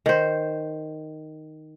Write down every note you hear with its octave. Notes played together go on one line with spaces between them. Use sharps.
D#3 C5